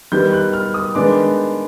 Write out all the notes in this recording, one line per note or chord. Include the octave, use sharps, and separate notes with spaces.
D#3 G3 B3 D#4 G6
F#6
F6
D#6
D#3 G#3 B3 D4 D6